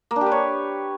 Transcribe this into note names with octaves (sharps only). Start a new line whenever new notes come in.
A#3
D4
G4
B4
C#5